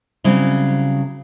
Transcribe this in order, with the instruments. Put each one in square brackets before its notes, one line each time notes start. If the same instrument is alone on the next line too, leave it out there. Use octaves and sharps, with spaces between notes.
[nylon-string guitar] C#3 F#3 G3 C4 E4